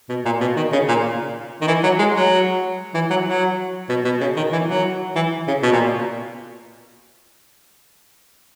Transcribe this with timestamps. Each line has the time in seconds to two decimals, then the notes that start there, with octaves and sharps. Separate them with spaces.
0.09 B2
0.25 A#2
0.41 B2
0.56 D#3
0.72 C#3
0.88 A#2
1.61 D#3
1.67 E3
1.83 F#3
1.99 G#3
2.15 F#3
2.94 E3
3.10 F#3
3.26 F#3
3.89 B2
4.05 B2
4.21 C#3
4.36 D#3
4.52 E3
4.68 F#3
5.16 E3
5.47 C#3
5.63 B2
5.72 A#2